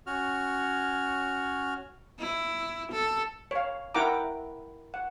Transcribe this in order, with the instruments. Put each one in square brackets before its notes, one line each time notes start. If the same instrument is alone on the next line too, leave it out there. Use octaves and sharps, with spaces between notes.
[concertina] C#4 F#4 F6
[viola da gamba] E4
A4
[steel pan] C#5 F5
E4 A#4 F#5 G5 A#5 D6
F#5